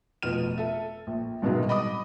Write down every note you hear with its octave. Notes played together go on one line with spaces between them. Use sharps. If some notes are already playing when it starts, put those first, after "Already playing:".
F1 B2 F3 F6 D#7
A4 E5
A#1
C2 G2 B2 D#3 F#3 G#3
D#5 B5 D6 D#6